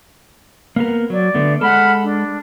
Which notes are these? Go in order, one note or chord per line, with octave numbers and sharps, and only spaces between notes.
A#3 B3 A#4
F#3 D5
D3 A3 B3
G#3 A4 F#5 B5 F6
D4